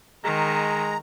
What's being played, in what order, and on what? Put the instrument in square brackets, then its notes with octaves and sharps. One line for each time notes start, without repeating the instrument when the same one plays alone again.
[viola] D#3 [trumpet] G#3 [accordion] A#5